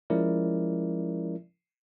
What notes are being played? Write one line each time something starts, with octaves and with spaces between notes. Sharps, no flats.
F3 G#3 C#4 E4 A#4 D5